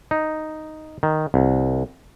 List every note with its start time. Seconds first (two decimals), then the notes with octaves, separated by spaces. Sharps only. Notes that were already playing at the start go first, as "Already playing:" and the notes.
0.11 D#4
1.03 D#3
1.34 C2